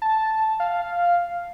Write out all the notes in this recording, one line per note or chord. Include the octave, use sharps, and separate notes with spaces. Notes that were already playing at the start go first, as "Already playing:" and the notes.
A5
F5